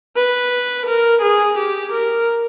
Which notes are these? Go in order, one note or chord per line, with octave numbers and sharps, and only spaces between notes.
B4
A#4
G#4
G4
A#4